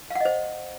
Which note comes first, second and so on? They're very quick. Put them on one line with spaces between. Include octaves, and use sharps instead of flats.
F5 F#5 D#5 C5